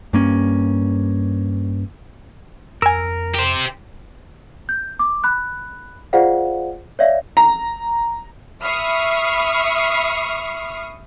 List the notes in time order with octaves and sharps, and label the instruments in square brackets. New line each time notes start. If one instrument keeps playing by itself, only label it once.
[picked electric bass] G2 A#3 C#4
[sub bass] F2 [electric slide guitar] A#4 [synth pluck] G#5 E6
[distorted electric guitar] G4 C5
[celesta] G6
D6
B5 F#6
F4 G#4 C5 D5 F5 F#5
C#5 D5 E5 F5
[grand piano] A#5
[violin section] E5 B5 C#6 D#6 F6 C7